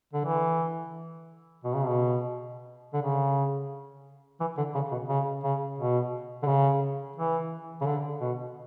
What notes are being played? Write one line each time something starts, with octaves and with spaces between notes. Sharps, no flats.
D3
E3
B2
C#3
B2
D3
C#3
E3
D3
C#3
B2
C#3
C#3
B2
D3
C#3
E3
C#3
D3
B2